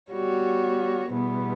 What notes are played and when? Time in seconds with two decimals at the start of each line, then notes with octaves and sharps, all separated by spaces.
0.12 G3 B3 F#4 C#5
1.11 E2 B2 G3 B3